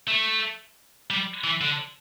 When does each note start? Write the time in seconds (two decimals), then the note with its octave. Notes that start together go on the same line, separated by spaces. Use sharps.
0.08 A3
1.10 G3
1.44 E3
1.61 D3